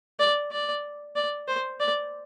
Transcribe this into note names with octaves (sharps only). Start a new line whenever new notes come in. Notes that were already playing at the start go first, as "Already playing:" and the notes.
D5
D5
D5
C5
D5